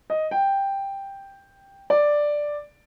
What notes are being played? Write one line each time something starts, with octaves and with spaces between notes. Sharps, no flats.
D#5
G5
D5